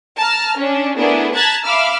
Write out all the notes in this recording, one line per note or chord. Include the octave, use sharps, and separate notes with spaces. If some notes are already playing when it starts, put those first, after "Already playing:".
A5 A#5 F6
C#4 D4
A3 B3 D4 E4 G#4 A#4
A5 A#5 F#6 G#6 A6 B6
E5 F5 B5 D6 E6 F6